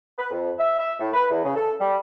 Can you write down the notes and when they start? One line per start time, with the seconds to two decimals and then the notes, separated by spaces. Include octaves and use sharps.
0.18 B4
0.31 F2
0.58 E5
0.78 E5
0.99 A2
1.14 B4
1.30 E2
1.44 C#3
1.55 A4
1.80 G3